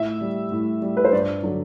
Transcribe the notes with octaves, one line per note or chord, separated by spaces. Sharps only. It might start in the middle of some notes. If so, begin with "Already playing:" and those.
Already playing: A2 E5
G3
A2
G3
B4
C5
G2 D5
D3 F#3